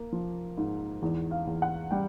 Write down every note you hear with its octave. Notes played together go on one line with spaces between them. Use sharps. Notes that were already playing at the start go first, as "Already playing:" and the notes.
Already playing: A#3
F3
G#2
E2
F5
E2
F#5
G3 G5